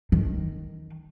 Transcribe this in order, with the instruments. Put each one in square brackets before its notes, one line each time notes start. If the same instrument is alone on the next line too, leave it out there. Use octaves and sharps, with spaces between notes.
[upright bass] D#3